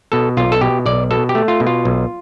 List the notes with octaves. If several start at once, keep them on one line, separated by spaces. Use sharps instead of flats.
B2 A4
B1 F4
A4
B2 G4
B1 D5
B2 A4
G4
A3
F4
B2
F4
B1